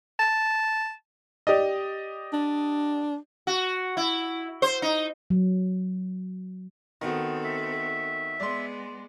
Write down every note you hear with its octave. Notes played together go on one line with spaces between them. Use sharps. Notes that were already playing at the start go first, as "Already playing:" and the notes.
A5
G4 D5 D#5
D4
F#4
E4
C5
D#4
F#3
D#3 B3 C4 F#4 A4
E5
G#3 B3 D5 C6